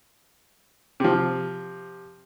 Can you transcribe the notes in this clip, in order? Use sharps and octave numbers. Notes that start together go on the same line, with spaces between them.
C3 F3